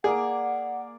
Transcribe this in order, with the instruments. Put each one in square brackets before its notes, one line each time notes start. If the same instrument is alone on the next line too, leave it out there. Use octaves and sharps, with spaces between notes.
[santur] A#3 A#4 D5 [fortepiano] G#4 [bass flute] F#5